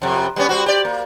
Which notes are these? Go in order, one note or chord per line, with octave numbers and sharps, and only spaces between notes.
F2 C3
G3 B3 C#4
G3 C4 F#4
G4 D5
A#3